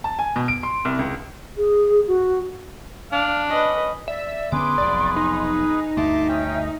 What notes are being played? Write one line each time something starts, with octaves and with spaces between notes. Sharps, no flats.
A5
G#5
B2
D7
C6
C2
C#2
G#4
F#4
D4 F5
C#4 B4 D#5
D5 E5
D3 B3 C#4 G#4 B4 C6 D6
F1 B1 D5
D#4
D2 G2 D3 E5 A5 C6 D6
C#4 G5